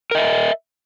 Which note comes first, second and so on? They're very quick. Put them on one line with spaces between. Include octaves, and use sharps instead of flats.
A#4 D#5 E5